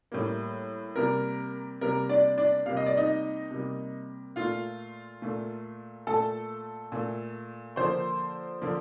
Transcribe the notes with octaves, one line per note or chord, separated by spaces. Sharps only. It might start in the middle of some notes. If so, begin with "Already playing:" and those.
A2 G3 A#3
C3 G3 A#3 A#4
C3 G3 A#3 A#4
D4 D5
D4 D5
C3 G3 A#3 F5
D#5
D5
D#4 D#5
C3 G3 A#3
A#2 A3 F4 F5
A#2 A3
A#2 A3 A4 A5
A#2 A3
D3 F3 A#3 C5 C6
D3 F3 A#3